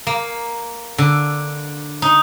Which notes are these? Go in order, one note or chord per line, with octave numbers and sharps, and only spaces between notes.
A#3
D3
D#4